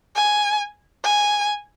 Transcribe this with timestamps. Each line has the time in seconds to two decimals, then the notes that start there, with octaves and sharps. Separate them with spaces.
0.16 G#5
1.05 G#5